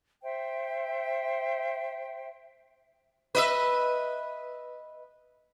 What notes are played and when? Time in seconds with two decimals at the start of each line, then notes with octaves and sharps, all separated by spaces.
0.22 C5 E5 G5
3.35 B4 D#5 E5